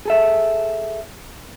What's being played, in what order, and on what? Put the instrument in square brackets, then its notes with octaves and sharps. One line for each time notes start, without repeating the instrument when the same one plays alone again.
[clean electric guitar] G#4 A4 E5